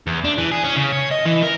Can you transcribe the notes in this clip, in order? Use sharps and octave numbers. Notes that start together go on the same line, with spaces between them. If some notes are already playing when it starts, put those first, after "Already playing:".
E2
D4
E3
G#4
C#4
C#3
C#5
D#5
E3
A#4